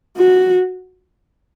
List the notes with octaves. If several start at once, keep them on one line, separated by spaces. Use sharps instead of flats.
F#4